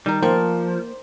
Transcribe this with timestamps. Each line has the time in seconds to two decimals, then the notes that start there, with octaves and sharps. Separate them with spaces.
0.06 D#3 G3 A#4
0.23 F3 A#3 C5 D5 G5 C#6